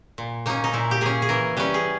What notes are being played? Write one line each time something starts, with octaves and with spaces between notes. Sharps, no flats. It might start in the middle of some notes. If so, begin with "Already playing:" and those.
A#2
A#3 C#4 D#4
D#4
A#2 E4
G4
A#3 C#4 G#4
G#4
E3 A#4
G3 C#4 B4
G#4